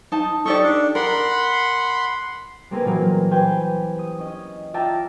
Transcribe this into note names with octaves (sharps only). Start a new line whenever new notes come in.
D#4 A5
D#4 G4 A4 D5 C#6
D4
A#4 F#5 B5 C6
G3 A#3 C4 G#4 A#4 B4
A#2 E3 F#3 A#3
G4 B4 C5 G5 G#5 G6
D#6
C#4 D#5
F4 D5 E5 G5 A5 A#5